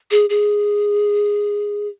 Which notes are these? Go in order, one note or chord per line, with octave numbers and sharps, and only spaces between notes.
G#4
G#4